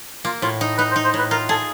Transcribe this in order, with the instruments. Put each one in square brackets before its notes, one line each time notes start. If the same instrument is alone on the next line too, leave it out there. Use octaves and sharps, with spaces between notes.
[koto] A#3 [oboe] F4
[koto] A2 [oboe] F4
[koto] D#4
[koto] D#4 [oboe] B4
[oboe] C5
[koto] D#4
[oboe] C5
[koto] A2 [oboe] B4
[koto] F4 [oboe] A#4
[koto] G#4 [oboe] A4